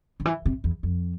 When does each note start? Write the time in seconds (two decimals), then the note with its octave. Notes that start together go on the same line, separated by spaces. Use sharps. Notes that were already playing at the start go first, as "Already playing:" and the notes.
0.20 D3
0.25 E3
0.46 C3
0.64 E2
0.83 F2